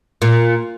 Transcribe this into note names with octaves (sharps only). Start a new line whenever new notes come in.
A#2